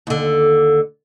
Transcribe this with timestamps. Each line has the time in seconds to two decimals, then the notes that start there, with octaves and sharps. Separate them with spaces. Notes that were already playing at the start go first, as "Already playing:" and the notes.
0.07 D#2 D3